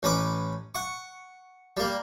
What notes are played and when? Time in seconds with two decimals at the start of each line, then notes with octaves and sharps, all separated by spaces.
0.03 A1 C#4 B4 D6
0.75 F#5 C#6
1.77 G3 A#3